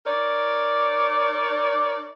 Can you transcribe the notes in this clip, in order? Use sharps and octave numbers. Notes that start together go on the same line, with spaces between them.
D#4 A#4 C#5 D5